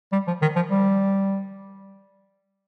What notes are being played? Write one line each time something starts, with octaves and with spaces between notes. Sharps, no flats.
G3
F3
D#3
F3
G3